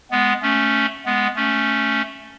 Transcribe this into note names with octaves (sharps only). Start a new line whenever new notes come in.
G#3 B3
A3 C#4
G#3 B3
A3 C#4